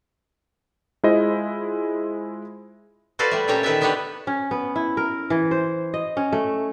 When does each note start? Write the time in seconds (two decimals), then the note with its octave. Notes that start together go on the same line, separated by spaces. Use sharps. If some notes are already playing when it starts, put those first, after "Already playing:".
1.03 G#3 E4 F4 C5 D#5
3.19 F#4 A4 B4 C5 D5 F5
3.31 G3 A3
3.48 A#2 C#4 G4 A4 C#5 A#5
3.63 D#3 A4 B4 D5 E5 A5
3.81 D3 B3 D4 G4 B4 C#5
4.27 C#4
4.51 B3
4.76 E4
4.97 A#4
5.30 E3
5.51 C5
5.94 D#5
6.17 C#4
6.32 A3